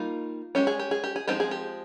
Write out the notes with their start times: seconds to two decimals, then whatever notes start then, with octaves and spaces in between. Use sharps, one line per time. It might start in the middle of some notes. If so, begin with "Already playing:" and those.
Already playing: G3 A#3 D#4 F4
0.55 G#3 C#4 G4
0.67 G#4
0.79 G4
0.91 G#4
1.04 G4
1.16 G#4
1.28 F3 G#3 C4 D#4 G4
1.40 G#4
1.51 G4